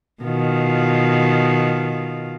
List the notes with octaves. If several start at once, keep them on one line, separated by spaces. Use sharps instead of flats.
B2 D#3 F4